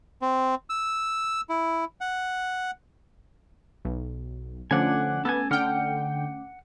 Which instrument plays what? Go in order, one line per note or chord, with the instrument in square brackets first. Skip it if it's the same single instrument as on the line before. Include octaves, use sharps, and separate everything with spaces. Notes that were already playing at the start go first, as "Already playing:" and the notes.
[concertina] C4
E6
E4
F#5
[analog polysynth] B1
[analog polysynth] D3 F3 [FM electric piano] A3 C#4 D6 [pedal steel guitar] D4 F#5 G#5
[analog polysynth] B3 [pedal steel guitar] A4 G#5
[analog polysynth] D3 G5 [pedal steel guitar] F#5 F6